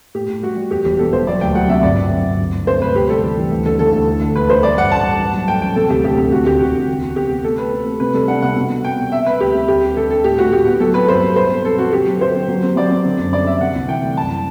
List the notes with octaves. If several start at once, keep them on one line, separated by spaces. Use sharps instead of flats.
A2 G4
A2
G3 F#4
G3
E2 G4
E1 G4
B2 A4
E1 C5
F#3 D5
D2 G5
F#3 F#5
C3 E5
G1 D5
G1
F#3
G1
D2
G3
C3 C5
D2 B4
C3 G4
G3 A4
E3
E3
D2
D3 A4
D3 A4
D2
D2
D2
E1 B4
E1 C5
G3 D5
G2 F#5
A1 A5
G3
A1
F#3
A3 G5
A1 G5
C3 A4
D2 G4
D2 G4
C3 G4
D2 F#4
D2 G4
E1 F#4
D2
D2
B3
C3 G4
B3
A3 A4
A3 B4
C4
A3
C3 B4
G3 A4
D4 F#5
C3 F#5
B2
G3
B2 G5
B3
C4 E5
G3 B4
D2 G4
C4
D2 G4
D3
G3 A4
D3 A4
A2 G4
A2 F#4
A2 G4
B3
F#3 A4
C4 B4
G2 C5
C4
B2 C5
C4
C4 A4
C4 F#4
D3 G4
F#3
F#3 C5
C4
F#3
C4
F#3 D5
C4
D3
F#2
G3 D5
D3 E5
C3 F#5
C2
E3 G5
A3
F#2 A5